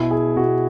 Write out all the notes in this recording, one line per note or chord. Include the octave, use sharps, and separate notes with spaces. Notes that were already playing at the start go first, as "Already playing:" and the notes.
Already playing: B2 E4
G#4
B2 F#4